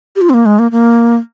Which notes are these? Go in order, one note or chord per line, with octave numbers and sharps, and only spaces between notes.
G4
F4
C4
A#3
G#3
A#3
A#3